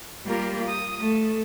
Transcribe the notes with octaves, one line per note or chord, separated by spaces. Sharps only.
G3 A#3 F4 G4 A#4
D#6
A3 A4